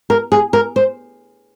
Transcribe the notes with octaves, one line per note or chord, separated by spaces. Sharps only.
A#4
G#4
A#4
C5